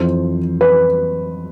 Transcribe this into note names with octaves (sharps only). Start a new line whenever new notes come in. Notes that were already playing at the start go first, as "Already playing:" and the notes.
Already playing: F2 E3 C5
B4